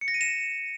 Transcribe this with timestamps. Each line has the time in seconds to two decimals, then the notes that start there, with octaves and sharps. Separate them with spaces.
0.01 C#7
0.08 A#6
0.14 D#7
0.21 E7